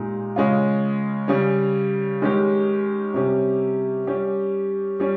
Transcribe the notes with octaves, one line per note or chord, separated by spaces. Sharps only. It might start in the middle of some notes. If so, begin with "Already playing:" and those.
Already playing: A#2 G#3 D#4 G4
C#3 G#3 C#4 F4
C#3 G3 C#4
D#3 G#3 C#4 G4
C3 G3 C#4 G4
G3 C#4 G4
G3 C#4